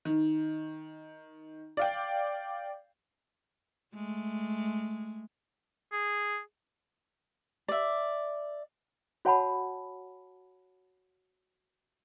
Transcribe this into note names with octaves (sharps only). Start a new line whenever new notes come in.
D#3
D5 F5 G5
G#3 A3
G#4
D5 E5
F#4 C#5 F#5 A5 B5